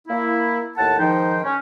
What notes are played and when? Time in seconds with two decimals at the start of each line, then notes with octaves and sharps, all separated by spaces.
0.08 A#3 E4
0.78 D#2 A2 F#5 A5
0.99 G#2 D#3 F3 D#4 C5 G5
1.44 C#4